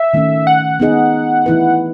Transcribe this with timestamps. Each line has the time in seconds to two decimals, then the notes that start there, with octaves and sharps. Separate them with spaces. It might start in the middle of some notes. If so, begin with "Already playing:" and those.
Already playing: E5
0.14 D#3 A3 C#4
0.47 F#5
0.80 B3 D#4 G#4 D#5
1.46 E3 A3 E4 B4